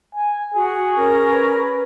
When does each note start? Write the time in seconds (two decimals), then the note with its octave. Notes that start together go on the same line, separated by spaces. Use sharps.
0.15 G#5
0.54 F#4 G#4
0.96 C#4 A#4
1.30 B4